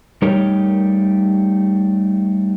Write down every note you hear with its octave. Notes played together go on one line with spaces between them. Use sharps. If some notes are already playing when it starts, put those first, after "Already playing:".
G3 A3 D#4 G4 A#4 C#5